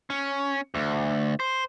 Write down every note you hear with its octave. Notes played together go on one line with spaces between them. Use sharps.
C#4
D2
C5